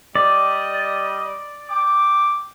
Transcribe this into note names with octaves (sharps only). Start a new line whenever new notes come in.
G3 D5 D#5 G5
G5 D6